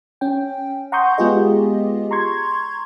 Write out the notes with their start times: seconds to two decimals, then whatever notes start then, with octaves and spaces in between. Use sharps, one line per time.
0.21 C#4 G5
0.92 F#5 A#5 C6 C#6 D#6 G6
1.18 G#3 B3 F4 G4 G#4 D#5
2.11 A#5 C6 C#6 G#6